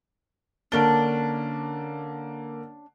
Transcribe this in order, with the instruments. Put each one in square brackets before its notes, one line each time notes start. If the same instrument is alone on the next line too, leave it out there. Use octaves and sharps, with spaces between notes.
[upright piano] D3 A#3 G7 [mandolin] C#4 D4